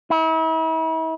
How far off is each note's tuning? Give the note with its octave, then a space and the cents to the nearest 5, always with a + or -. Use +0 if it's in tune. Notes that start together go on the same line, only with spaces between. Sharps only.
E4 -40